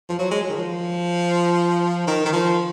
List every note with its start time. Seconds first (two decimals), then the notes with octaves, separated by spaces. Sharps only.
0.09 F3
0.19 F#3
0.31 G#3
0.43 F#3
0.50 D#3
0.56 F3
2.07 D#3
2.25 D#3
2.33 F3